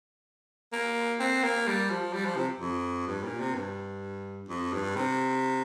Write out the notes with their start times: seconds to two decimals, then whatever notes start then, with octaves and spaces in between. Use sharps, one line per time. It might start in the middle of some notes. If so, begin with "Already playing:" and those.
0.73 A#3
1.20 C4
1.43 A#3
1.67 G3
1.90 F3
2.14 G3
2.26 F3
2.37 C3
2.60 F2
3.07 G2
3.24 A#2
3.40 C3
3.55 G2
4.49 F2
4.73 G2
4.96 C3